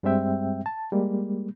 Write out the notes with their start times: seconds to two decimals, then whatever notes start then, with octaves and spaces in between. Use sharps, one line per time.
0.03 G2 G3 G#3 C4 E5 G5
0.66 A5
0.92 G3 G#3 A#3